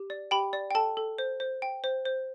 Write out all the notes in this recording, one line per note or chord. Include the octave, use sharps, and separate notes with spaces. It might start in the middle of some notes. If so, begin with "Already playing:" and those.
Already playing: G4
D5
G4 G5 B5
D5
G5
A4 A5
A4
C5
C5
G5
C5
C5